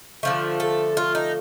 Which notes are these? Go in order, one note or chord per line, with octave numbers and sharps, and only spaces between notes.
D3 F3 A3
A4
F4
D#4